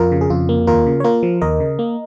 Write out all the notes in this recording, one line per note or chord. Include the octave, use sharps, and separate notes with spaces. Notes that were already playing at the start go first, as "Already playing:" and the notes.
Already playing: F2 F4 A#4
C#3
G#4
F2 F4
A#3
D#2 F4 A#4
C#3
C#5
A#3 F4 A#4
F3
D#2 A#4 D#5
C#3
A#3